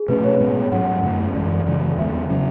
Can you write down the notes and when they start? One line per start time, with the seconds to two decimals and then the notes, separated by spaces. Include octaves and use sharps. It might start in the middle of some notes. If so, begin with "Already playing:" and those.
Already playing: G#4
0.08 B2 A3 C#4 B4
0.24 C#5
0.40 A2 G#3 B3
0.71 G#2 F#3 C#4 F#5
1.03 F#2 D3 A3 C#4
1.35 F#2 E3 G#3 D5
1.66 F#2 C#3 E3 G#3
1.97 E2 D3 G#3 B3 E5
2.30 C#3 F#3 C#4